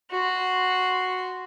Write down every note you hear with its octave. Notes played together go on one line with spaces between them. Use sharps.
F#4 C6